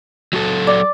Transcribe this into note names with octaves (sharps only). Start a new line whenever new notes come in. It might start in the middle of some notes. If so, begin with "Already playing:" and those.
F#3 F#4 A4
D5